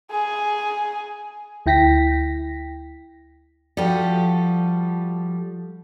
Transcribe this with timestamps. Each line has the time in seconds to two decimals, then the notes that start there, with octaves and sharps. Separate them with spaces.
0.11 G#4
1.66 D2 E4 G5 A#6 B6
3.77 F3 G3 F#4 G4 A4